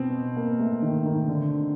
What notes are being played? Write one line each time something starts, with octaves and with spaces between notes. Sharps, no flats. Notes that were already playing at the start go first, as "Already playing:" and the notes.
Already playing: B2 B3 C4
A#3
A3
D#3
D#3
D3